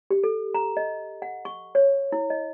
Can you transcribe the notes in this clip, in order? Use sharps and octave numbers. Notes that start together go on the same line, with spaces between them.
G4
A4
A#5
D#5
F#5
C#6
C#5
E4
D#5